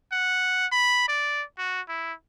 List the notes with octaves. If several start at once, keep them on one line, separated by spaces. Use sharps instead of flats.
F#5
B5
D5
F#4
E4